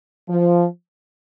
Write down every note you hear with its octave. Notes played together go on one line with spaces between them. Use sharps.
F3